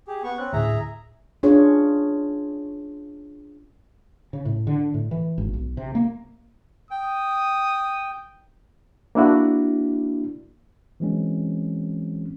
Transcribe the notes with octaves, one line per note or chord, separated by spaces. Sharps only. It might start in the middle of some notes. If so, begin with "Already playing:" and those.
G4 G#4
B3 C#6
C4 C#4 F#6
D2 A2 G#4 E5 A#5
C#4 D4 F4 G#4 C#5
C#3
A2
D3
A2
E3
G#1
B1
C3
A#3
G5 D#6
A#3 D4 E4 F#4
E3 F#3 G#3 C4 C#4